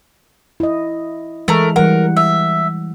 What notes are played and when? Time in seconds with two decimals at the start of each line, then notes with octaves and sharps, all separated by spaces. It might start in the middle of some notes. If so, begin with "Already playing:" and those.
0.60 E4 D#5
1.48 E3 G#3 A3 A#4
1.76 E3 G3 A#4 F#5
2.17 E5